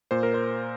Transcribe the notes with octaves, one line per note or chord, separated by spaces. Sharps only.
A#2 C5
A#4
C5